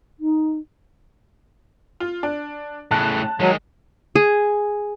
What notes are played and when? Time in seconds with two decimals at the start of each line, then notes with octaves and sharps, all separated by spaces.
0.19 D#4
2.00 F4
2.23 D4
2.91 A2 C#3 A5 F#6
3.40 D#3 F#3 G#3
4.15 G#4